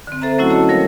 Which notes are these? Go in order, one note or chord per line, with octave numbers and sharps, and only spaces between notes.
D3 C4
A4 C5 E5 A#5
F#3 A3 C#4 E4 F#4
A#3 C#5 D#5 A5 E6
F3 G3 A#4 C#5 F5